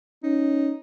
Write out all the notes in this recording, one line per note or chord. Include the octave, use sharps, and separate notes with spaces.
C#4 D#4